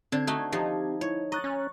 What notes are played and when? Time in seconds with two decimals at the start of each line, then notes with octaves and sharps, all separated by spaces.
0.12 D3 C4 G#6
0.27 A3 D#4 F#4
0.52 F3 D#4 G4
1.01 E4 C#5
1.32 D#5 A#5 C#6 F#6 A6
1.44 C#4